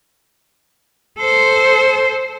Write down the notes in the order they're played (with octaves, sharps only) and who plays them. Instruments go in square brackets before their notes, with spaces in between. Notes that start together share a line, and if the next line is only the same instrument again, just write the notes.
[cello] A4 C5